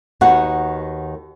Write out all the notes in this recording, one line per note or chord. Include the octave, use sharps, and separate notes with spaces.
D#2 D#3 B3 F#4 F#5